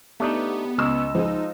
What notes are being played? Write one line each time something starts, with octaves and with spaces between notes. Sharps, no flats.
A3 B3 D4 D#4 G4
C#2 D#5 C#6 E6
F3 G#3 D#4